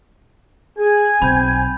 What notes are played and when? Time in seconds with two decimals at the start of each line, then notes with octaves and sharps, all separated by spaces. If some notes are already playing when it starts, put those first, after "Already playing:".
0.77 G#4 G#5 G#6
1.22 B1 B2 C4 B5 G6